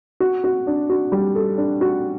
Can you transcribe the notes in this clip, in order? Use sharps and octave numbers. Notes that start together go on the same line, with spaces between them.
F#4
F#4
D4
F#4
G3
A4
D4
F#4